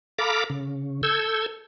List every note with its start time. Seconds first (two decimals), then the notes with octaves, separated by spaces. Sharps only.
0.19 A4 F5 A#5 B5 D6
0.50 C#3
1.03 A4 E6 G6 G#6